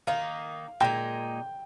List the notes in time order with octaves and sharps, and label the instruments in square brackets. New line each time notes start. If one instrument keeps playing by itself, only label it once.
[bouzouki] D#3 A#3 D#4 [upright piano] F5
[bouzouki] A#2 G#3 D#4 [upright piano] G5